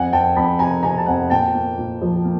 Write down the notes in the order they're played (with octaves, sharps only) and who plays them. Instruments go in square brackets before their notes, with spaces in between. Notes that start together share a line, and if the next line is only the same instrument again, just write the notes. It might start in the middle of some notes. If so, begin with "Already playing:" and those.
Already playing: [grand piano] F2 F#5 G#5
F2 G5 A5
F2 A5 B5
C3 G#5 A#5
C3 G#5 A#5
A5
F2 F#5 G#5
A#2 G5 A5
A#3
A#2
F3
A#3